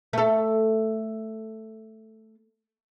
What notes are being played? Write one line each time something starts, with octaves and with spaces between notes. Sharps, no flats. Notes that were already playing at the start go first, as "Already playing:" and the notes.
A3 A4